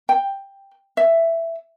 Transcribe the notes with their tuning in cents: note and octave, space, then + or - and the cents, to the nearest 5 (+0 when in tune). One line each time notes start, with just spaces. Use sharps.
G5 +5
E5 +10